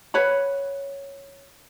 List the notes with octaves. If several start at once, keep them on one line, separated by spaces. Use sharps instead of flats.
B4 C#5 F#5 B5